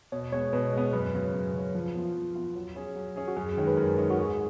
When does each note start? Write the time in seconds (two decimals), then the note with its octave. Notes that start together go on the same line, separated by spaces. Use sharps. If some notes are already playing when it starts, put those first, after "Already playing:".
0.12 B2 C#5
0.32 G#3 B3 C#5
0.53 B2 B4
0.73 G#3 B3
0.93 F#2 B4
1.13 C#3 F#3 C#4
1.34 F#2
1.54 C#3 F#3 C#4
1.75 F3
1.95 B3 F4
2.15 F3
2.35 B3 F4
2.55 F#3
2.76 C#4 G#4
2.95 F#3
3.16 C#4 G#4
3.28 F#4
3.37 F#2 G#4
3.57 D#3 G#3 C#4
3.67 B4
3.77 F#2 A#4
3.98 D#3 G#3 C#4
4.10 F#4
4.18 G#2 G#4